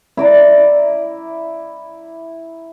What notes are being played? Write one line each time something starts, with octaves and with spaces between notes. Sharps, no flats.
E4 D5 A#5